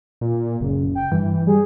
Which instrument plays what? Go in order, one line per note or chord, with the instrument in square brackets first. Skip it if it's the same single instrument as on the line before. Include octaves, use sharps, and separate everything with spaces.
[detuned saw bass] A#2
[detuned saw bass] F#1 [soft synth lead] C#3
[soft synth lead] G5
[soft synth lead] G2 [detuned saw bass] E3
[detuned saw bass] G3 [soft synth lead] G#4